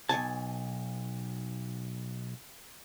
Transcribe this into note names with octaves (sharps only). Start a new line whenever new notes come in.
B1 B2 G#5 A5